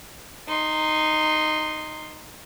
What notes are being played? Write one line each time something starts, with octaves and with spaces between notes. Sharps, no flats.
D#4 C6